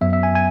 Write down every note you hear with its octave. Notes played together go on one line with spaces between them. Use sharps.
F#2 F#3 B3 E5
E5
G#5
G#5